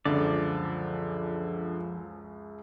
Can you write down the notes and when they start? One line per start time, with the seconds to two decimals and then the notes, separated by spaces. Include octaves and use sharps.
0.05 C#2 F#2 D3 F3 D5 A5